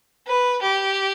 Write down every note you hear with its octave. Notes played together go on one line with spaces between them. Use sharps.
B4
G4